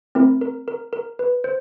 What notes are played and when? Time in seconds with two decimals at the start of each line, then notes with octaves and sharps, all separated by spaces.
0.15 A3 C4 E4 A#4
0.41 A#4
0.68 A#4
0.93 A#4
1.19 B4
1.44 C5